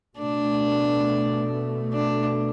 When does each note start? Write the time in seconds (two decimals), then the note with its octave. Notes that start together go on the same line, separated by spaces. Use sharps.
0.18 B2 A3 D4
1.93 D4